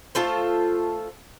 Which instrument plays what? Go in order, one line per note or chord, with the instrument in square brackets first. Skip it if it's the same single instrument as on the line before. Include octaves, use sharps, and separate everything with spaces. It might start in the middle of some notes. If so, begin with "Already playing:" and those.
[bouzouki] A3 F4 A4 C5